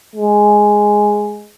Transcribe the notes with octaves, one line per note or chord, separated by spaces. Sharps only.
G#3